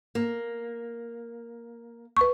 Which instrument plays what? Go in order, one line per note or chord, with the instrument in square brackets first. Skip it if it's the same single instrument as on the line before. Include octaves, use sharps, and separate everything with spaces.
[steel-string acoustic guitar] A#3
[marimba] B4 C#6